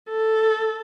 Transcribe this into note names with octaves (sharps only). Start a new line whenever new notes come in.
A4